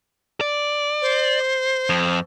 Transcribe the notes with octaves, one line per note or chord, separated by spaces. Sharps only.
D5
C5
F2